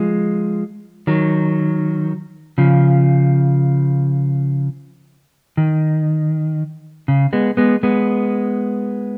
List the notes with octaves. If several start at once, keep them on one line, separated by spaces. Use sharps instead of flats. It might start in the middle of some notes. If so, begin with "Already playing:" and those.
Already playing: F3 G#3
D#3 F#3
C#3 F3
D#3
C#3
G#3 B3
G#3 B3
G#3 B3